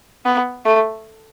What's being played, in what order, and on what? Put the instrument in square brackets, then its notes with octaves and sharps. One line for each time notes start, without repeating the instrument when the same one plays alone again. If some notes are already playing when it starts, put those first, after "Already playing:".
[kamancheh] B3
A3